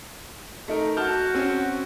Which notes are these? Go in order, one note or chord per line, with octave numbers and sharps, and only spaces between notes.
A3 D#4 A#4
F#4 A5 F6 G6
C4 C#4